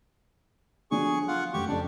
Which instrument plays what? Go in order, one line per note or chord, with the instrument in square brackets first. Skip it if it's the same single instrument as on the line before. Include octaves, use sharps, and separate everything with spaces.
[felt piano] D3 F3 F#3 [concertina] G#4 C#6
[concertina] F4 F#5
[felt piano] F1 F#2 [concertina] G4 C#6
[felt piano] F2 C#3 [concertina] D4